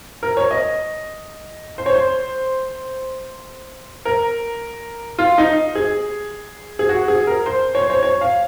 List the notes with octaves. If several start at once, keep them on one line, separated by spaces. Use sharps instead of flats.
A#4
C#5
D#5
C5
C#5
C5
A#4
F4
D#4
G#4
G#4
F#4
G#4
A#4
C5
C#5
C5
C#5
C#5
F5